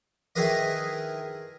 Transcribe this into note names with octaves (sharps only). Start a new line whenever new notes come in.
D#3 E4 G#4 A#4 B4 D#5